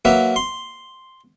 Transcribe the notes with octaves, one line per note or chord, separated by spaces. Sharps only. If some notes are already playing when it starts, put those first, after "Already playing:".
F#3 A#3 B4 E5
C6